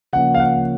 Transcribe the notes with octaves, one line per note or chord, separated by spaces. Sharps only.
C#3 F3 A#3 C#4 F#5
F5
F#5